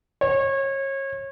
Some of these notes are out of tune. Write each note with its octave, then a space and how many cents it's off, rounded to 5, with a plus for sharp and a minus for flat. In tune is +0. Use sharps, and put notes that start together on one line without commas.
C#5 -30